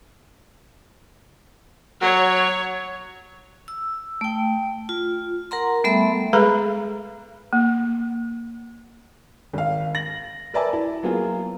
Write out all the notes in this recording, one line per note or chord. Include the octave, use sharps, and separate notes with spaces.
F#3 C#5
E6
A3 G5
F4
A#4 F#5 A#5 C6
G3 A3 B3 A4 E5 B5
G#3 G#4 A4 B4 A#5 B5
A#3
G#1 F5
A#6 F#7
A#4 B4 D5 E5 G#5 A5
E4
F#3 A#3 B3 F4 G#4